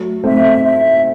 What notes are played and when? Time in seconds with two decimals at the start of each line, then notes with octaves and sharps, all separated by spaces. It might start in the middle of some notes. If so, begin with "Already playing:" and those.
Already playing: F#3 A3
0.24 A3 C4 E5
0.64 E5